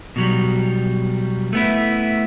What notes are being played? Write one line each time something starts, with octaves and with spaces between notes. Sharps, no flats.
B2 F#3 G3
A3 B3 E4